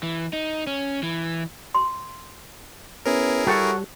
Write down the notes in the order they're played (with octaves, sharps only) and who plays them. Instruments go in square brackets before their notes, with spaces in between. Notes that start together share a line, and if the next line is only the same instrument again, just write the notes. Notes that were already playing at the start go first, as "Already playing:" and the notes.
[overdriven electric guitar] E3
D#4
C#4
E3
[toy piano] C6
[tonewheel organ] B3 C#4 [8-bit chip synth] E4 G#4 A#4
[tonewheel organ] G3 [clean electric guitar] F#4 A4 C#5